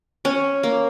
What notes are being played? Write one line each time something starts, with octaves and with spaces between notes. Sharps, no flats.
C#4
A#3